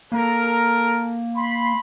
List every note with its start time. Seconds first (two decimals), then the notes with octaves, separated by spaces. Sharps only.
0.12 A#3 A4 A#4
1.35 B5 C6